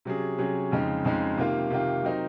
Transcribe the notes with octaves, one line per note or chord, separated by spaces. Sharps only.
C3 F#3 C#4 G#4
C3 F#3 C#4 G#4
F2 C#3 F3 G#3 D#4
F2 C#3 F3 G#3 D#4
C3 D#3 A#3 F4
C3 D#3 A#3 F4
F#3 C4 D#4 A#4